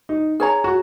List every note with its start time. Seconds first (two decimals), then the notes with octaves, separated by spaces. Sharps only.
0.09 D#4
0.40 G#4 C#5 A#5
0.64 F#4